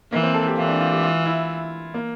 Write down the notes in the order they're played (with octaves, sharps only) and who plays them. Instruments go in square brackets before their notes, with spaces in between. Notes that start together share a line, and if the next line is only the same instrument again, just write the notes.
[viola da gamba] E3 [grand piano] A#3
[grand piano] C4
A4
G4
[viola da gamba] E3 [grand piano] F4
[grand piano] C4
D4
F4
G4
F4
E4
A#3